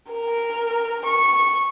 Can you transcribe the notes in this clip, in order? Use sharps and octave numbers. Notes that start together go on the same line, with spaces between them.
A#4
C#6